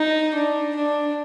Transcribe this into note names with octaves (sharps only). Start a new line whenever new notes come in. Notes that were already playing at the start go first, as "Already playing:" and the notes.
Already playing: D#4
D4
D4